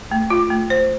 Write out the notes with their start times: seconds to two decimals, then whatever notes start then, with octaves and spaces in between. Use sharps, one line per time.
0.11 A3
0.30 F4
0.51 A3
0.70 C5